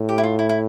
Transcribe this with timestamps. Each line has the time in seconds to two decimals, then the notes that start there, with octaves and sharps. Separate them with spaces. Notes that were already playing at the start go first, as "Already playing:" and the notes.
Already playing: A2
0.09 G4
0.18 E4
0.23 F4
0.39 E4
0.49 E4